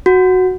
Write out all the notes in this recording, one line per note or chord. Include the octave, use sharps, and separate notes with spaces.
F#4